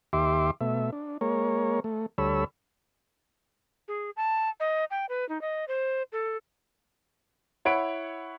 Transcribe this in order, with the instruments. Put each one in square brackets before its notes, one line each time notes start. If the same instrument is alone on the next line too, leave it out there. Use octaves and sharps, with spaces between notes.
[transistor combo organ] D#2 G4 E5 C6 D6
B2 A3 E5
D4
G#3 A#3 A#4 C#5
A3
D2 G3 A4 C#5 B5 E6
[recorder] G#4
A5
D#5
G5
B4
D#4
D#5
C5
A4
[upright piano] E4 C#5 F#5 B5 D7